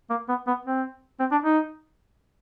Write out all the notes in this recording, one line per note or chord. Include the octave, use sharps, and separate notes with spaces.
A#3
B3
B3
C4
C4
D4
D#4